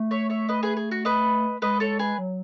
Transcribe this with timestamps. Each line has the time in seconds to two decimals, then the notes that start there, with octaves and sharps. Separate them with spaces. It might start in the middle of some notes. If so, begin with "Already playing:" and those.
Already playing: A3
0.11 C#5 E5
0.30 C#5 E5
0.49 B4 D#5
0.63 G#4 B4
0.77 G#4
0.91 F#4
1.05 B4 D#5
1.62 G#3 B4 D#5
1.80 A4 C#5
1.99 G#4 B4
2.18 F#3